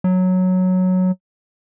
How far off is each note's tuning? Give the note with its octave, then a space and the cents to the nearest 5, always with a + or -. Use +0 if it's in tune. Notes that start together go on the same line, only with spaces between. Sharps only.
F#3 -5